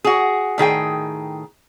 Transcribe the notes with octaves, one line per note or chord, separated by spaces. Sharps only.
F#4 G#4
A2 D#3 G#4 G5